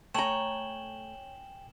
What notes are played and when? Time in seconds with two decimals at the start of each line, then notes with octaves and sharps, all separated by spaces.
0.14 A3 C#5 G5 G#5 A#5 E7 F#7 G7